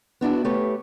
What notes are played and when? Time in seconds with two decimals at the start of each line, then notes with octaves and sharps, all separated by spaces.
0.21 B3 D4 E4 F#4
0.45 A3 G4 B4 C#5